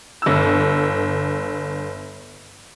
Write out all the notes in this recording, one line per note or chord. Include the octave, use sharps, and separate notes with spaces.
G1 E6